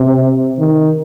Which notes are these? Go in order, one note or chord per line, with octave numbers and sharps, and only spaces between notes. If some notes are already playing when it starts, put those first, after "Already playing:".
Already playing: C3
D#3